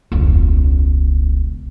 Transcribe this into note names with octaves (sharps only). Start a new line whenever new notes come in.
E1 C#2